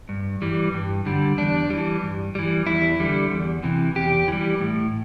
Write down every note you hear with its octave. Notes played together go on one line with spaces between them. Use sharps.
G2
E3 G3
G2
D3 G3
E2 D4
E3 G3
G2
E3 G3
E2 E4
D3 G3
E2
C3 E3
E2 G4
E3 G3
A2